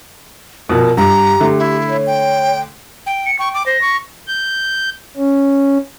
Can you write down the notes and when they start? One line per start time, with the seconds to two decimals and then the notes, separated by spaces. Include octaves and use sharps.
0.69 A#1 B2 A#4
0.97 G2 G4 A#5
1.40 D3 A3
1.59 E4
1.89 C#5
2.06 G5
3.06 G5
3.26 C#7
3.39 G5 C#6
3.54 D6
3.66 C5 A#6
3.81 C#6
4.28 G6
5.16 C#4